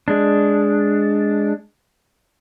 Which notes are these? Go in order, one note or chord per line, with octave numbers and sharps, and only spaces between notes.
G#3 D4